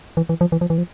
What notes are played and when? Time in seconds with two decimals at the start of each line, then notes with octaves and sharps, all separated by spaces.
0.17 E3
0.29 E3
0.41 F3
0.52 E3
0.61 F3
0.70 E3
0.78 F3